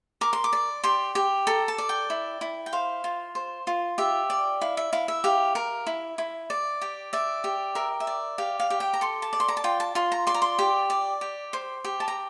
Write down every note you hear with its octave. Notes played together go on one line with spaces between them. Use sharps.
A#4 D6
C6
D6
D5
G4 C6
G4
A4 A#5
A5
D5
G5
E4
E4
G5
C5 F5
F4
C5
F4
G4 E5
D5
E4 F5
E5
E4 F5
E5
G4 F5
A#4
E4
E4
D5
G4
D5 E5
G4
A#4 E5
E5
D5
G4 F5
F5
G4
G5
A#5
A4 C6
A5
D5
C6
A#5
A5
F4 G5
A5
F4 C6
A#5
D5 C6
A#5
C6
G4
D5
G4
C5
G4
A5
A#5